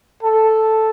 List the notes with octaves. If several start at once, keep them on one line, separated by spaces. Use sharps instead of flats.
A4